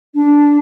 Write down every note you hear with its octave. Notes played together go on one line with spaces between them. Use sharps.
D4